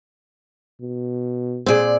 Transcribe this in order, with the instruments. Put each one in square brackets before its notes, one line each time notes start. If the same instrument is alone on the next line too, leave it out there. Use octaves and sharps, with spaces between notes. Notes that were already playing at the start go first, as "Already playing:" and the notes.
[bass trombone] B2
[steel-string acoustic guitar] A#2 D5 [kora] C4 G#4